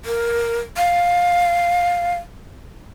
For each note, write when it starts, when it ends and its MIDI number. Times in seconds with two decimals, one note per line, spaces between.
0.05 0.59 70
0.77 2.14 77